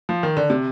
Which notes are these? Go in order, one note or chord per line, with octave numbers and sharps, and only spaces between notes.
F3
D#3
D3
C3